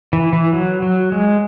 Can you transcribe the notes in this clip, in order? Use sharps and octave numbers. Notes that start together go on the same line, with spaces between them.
E3
E3
F#3
F#3
G#3